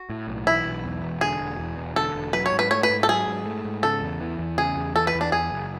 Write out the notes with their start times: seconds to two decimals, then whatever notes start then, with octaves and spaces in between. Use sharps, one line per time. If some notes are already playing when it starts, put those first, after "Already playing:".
Already playing: F#4
0.10 A2
0.28 B1
0.46 E3 E4
0.66 B1
0.84 E2
1.03 E1
1.21 D3 G#4
1.41 E1
1.59 E2
1.78 E1
1.96 D3 A4
2.15 E1
2.33 F#3 B4
2.46 C#5
2.52 G#2
2.59 B4
2.71 A3 C#5
2.83 B4
2.90 G#2
3.03 A4
3.08 F#3 G#4
3.27 G#2
3.46 A3
3.65 G#2
3.83 C#3 A4
4.02 E2
4.21 E3
4.39 E2
4.57 C#3 G#4
4.76 E2
4.95 E3 A4
5.07 B4
5.15 E2
5.21 D4
5.32 E2 G#4
5.52 F#1